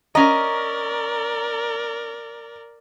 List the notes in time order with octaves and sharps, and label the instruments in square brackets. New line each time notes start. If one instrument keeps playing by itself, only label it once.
[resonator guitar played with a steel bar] C#4 D#5 [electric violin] A#4 D5 [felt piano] A#5